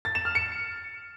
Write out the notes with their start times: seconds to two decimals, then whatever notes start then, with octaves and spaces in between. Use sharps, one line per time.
0.05 A6
0.15 E7
0.25 F6
0.35 C#7